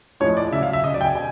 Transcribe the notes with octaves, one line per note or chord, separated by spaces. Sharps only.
A2 F3 G#3 C#5
D5
C#3 F#3 E5
F5
E5
C#3 F#3 D#5
D5
G5
G#5
B2 G#5